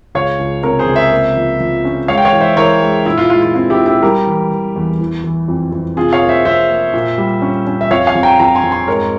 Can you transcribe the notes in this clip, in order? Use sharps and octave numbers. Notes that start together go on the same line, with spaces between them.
C#2 C#5 F5
C#2
C3 A#4 C#5
G#4 C5
C#2
C5 E5
A#3
F3
F3
C#4
G#3 C#5 F5
G5
C#5 F5
E3
C5 E5
E3 A#4 C#5
G#3
A#2 E4
F4
G#3 F4
F4
C4 F4
E4 G4
A#2
E4 G4
G3 G4 A#4
E3
E3
E2
E3
E3
F2
F2
C3 F4 G#4
C#5 F5
A#3
C5 E5
F2 C5 E5
A#3
A#2
G3
C#4
C#4
E5
F2 C#5 F5
F5 G#5
F2
G5 A#5
F2 G5 A#5
G#5 C6
F2
G#5 C6
G#2 A#4 C#5